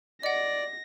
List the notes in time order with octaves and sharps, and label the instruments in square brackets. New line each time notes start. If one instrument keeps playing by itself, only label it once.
[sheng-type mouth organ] D5 [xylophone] D#5 F#5 [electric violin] A#6